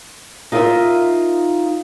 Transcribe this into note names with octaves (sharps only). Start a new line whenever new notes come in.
D#4 F4 A#4 C5 D#5 E5